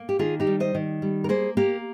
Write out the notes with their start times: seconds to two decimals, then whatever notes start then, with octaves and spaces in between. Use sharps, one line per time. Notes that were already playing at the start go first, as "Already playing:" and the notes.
Already playing: A#3
0.09 G4
0.19 D#3 F4 G#4
0.40 D#4 G4
0.47 G3
0.60 C5 D#5
0.75 D#3
1.02 G3
1.24 A#4
1.29 A#3 G#4 C5
1.57 A#3 G4 A#4